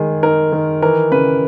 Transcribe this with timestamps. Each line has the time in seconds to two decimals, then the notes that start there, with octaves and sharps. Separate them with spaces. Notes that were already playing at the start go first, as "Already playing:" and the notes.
Already playing: D#3 G#3 G#4
0.23 D#4 A#4
0.52 D#3
0.82 E3 A#4
1.12 C#3 B4